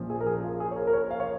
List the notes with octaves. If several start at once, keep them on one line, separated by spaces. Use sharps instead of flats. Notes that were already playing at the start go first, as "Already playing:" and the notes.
Already playing: A#1 A#2 F3 A#3 C#4
G#4
A#4
G#4
F4
G#4
C#5
A#4
A#4
C#5
F5
C#5